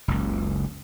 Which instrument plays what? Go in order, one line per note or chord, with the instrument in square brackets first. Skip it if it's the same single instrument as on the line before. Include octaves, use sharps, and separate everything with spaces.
[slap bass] F#1 C#2